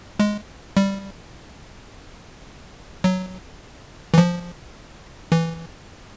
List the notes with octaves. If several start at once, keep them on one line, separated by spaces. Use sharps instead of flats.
G#3
G3
F#3
E3
F3
E3